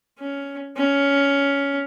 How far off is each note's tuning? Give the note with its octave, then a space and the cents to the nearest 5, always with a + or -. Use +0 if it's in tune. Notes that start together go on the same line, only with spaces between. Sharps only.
C#4 +10
C#4 +15